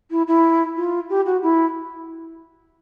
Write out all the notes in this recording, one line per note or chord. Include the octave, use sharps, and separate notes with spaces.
E4
E4
F4
G4
F#4
E4